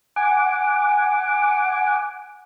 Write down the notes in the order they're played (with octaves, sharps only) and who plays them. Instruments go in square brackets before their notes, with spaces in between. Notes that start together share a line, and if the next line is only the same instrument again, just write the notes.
[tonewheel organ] F#5 D6 [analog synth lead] G#5